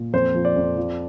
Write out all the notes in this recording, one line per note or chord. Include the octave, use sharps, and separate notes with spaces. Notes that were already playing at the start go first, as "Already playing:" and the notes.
Already playing: A#2
F2 C5
F3
D5
F2
F3